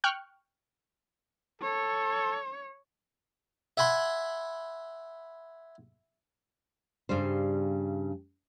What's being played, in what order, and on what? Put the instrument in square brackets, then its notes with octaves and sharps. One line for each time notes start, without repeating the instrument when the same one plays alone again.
[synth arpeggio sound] G5 C#6 F6 F#6
[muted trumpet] A4 [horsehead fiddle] C#5
[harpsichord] E5 F#5 G#5 B5 C6
[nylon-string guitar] G2 C#3 G3 C5